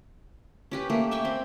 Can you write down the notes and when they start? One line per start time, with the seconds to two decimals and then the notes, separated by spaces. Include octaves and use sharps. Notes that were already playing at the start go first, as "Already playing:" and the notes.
0.71 C#4 G4 B4
0.90 A3 A#3 G4
1.11 E5 G5 G#5 C#6
1.25 C4